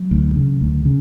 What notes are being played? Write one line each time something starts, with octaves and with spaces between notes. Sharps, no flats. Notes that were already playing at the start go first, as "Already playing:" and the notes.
Already playing: F#3
D2
C#3
D2
C#3